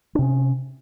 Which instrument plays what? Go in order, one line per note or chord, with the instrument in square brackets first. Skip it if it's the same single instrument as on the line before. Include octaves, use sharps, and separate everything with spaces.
[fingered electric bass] D4
C3
C#4